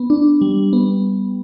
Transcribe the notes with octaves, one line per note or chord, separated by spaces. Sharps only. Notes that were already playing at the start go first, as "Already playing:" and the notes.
Already playing: B3
D4
G3
B3